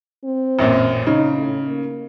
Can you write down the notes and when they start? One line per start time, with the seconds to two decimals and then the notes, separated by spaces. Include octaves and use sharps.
0.24 C4
0.59 A1 F#2 A#2
1.06 C#3 D#4
1.37 A2
1.68 A#3